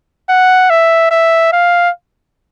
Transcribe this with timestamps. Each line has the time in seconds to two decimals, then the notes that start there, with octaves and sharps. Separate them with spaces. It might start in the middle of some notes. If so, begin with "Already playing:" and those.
0.29 F#5
0.70 E5
1.11 E5
1.52 F5